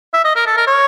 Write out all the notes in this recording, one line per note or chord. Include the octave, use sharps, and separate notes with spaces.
E5
D#5
A#4
A4
A#4
C#5